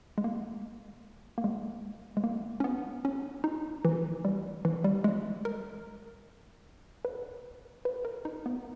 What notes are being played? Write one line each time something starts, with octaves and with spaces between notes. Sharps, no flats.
G#3
A#3
A#3
G#3
G#3
A#3
C#4
B3
C#4
D#4
E3
G3
E3
G3
G#3
A#4
B4
B4
A#4
D#4
B3